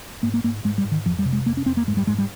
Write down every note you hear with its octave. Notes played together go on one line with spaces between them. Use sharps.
G#2 A#3
A#3
G#2 A#3
G#2 G#3
G3
G#2
D#3
F2 F3
G3
C3
G#3
F2 A#3
C#4
F2 C4
A#3
G#2 G#3
G3
G#2 G#3
G3